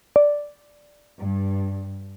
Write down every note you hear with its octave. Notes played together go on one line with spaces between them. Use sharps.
D5
G2